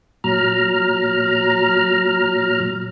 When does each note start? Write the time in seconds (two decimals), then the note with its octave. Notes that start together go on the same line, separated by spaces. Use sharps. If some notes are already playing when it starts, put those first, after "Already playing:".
0.24 A#2 F#3 A#5 F6